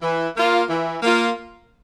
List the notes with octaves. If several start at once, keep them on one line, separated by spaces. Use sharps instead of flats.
E3
A#3 F4
E3
A#3 F4